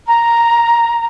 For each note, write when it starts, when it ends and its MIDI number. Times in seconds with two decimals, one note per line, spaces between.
0.07 1.06 82